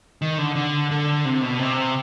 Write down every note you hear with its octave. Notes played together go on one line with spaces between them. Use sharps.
D#3
D3
D3
D3
C3
B2
C3